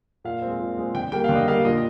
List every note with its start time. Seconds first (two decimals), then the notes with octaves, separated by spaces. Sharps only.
0.24 A#2 F5
0.42 G#3 C4
0.60 A#2
0.77 G#3 C4
0.95 D3 G5
1.12 G3 A#3 G5
1.24 D3 F5
1.35 D#5
1.47 G3 A#3 F5
1.65 A#2 D#5